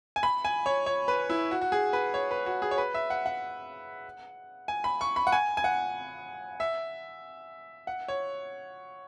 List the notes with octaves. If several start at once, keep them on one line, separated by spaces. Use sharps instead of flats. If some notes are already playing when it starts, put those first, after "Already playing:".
G#5
B5
G#5
C#5
C#5
B4
E4
F#4
F#4
G#4
B4
C#5
B4
F#4
G#4
C#5
B4
E5
F#5
F#5
G#5
B5
C#6
B5
F#5
G#5
G#5
F#5
E5
F#5
C#5